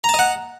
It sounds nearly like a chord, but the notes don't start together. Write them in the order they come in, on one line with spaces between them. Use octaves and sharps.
A#5 A5 D#5 F#5